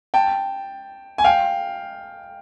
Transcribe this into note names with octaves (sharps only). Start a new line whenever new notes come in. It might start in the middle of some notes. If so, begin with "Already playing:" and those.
G5 A5
G#5
F5 G5